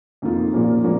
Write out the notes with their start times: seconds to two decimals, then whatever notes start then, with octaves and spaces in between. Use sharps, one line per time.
0.22 F2 D#3 A#3 F4
0.53 A#2 F3 A#3 C#4
0.84 A#2 F3 A#3 C#4